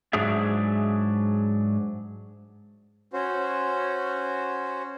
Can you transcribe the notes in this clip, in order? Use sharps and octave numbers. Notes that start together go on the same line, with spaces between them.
G#2 F#3 D4 G#4 E5
C#4 F#4 C5